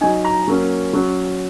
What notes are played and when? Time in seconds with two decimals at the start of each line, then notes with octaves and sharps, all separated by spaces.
0.01 F#3 D#4 G#5
0.25 A#5
0.47 F#3 A#3 C#4
0.93 F#3 C#4